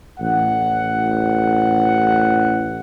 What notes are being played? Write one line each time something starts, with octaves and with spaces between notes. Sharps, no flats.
A1 F#5